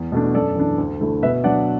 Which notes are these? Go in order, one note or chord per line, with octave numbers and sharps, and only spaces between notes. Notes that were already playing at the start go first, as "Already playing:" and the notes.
Already playing: E2
B2 A3 D4
F#2 A4 D5
E3 D4
D2
D3 A3 E4
B2 B4 E5
F#3 D4 D5 F#5